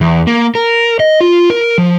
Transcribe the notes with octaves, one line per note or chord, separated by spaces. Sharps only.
E2
A#3
A#4
D#5
F4
A#4
F3